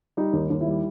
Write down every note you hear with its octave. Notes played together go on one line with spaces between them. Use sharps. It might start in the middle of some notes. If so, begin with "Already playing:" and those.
G3 D#4
D#2
D#2
E4
G3